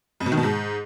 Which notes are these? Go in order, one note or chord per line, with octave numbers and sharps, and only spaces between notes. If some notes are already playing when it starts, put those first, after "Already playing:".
F2
B2
D#3
B2
G#2